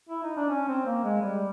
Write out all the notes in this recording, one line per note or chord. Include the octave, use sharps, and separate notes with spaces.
E4
D#4
D4
C#4
C4
A#3
G#3
G3